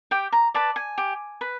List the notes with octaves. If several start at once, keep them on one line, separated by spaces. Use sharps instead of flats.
G4 G5
A#5
B4 D5 A5
G#5
G4
B4